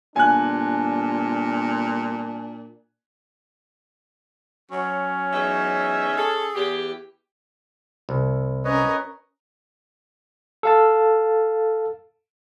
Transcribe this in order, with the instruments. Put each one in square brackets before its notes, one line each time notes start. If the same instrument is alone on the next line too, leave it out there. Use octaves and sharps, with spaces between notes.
[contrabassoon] G1 [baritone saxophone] A#2 [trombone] D4 [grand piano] G#5 F#6
[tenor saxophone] F#3 [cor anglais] C#4
[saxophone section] E2 D#4 E5
[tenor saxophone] G#4 [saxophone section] A4
[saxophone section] E2 G4
[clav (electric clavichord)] C2
[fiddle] C#4 A#4 [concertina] B4 C#5 D#5
[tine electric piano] A4 F5 A5